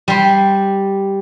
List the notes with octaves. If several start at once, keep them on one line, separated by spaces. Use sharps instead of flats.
G3 C6